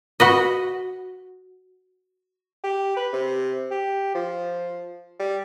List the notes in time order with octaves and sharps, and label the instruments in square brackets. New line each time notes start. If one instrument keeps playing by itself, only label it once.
[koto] F#4 B4 D#5
[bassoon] G4
B4
C3
G4
F3
G3